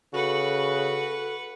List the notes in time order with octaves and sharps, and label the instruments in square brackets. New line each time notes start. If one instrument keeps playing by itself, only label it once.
[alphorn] C#3 [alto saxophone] F#4 [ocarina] A4 [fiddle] B4 F#5